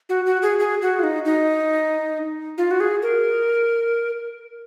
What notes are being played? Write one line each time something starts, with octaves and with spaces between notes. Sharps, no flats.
F#4
F#4
G#4
G#4
F#4
F4
D#4
D#4
F4
F#4
G#4
A#4